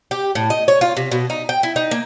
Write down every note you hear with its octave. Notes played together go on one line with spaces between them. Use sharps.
G4
A2
D#5
C#5
F4
C3
B2
D#4
G5
E4
D#4
A#3